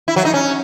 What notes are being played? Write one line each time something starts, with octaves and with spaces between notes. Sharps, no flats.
E4
F#3
D#4
C#4